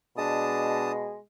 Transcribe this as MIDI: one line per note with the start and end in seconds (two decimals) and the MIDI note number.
0.18 1.19 47
0.18 1.18 56
0.18 0.92 62
0.18 0.92 81
0.18 0.92 87